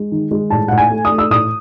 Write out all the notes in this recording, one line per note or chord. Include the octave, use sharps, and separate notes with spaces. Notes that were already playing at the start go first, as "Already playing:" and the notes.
Already playing: G#3
D#3
G#3
A2 A5
A2 F#5
G#5
A3
D#6
A3
E6
A2 D#6